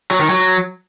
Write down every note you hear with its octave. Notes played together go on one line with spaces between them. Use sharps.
F#3
D#3
F#3